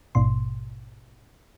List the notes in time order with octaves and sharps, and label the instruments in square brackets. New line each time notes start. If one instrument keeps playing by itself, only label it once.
[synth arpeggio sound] A1 G#2 B2 C6